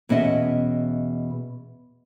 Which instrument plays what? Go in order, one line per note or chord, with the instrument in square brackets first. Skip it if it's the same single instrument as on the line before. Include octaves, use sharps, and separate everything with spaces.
[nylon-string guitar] E2 B2 C#4 D#5 E5